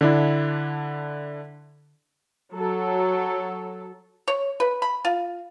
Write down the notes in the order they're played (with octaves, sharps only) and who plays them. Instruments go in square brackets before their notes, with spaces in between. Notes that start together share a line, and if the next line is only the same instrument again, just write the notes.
[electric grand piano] D3 D4 E4
[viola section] F#3 A4
[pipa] C#5
B4
B5
F4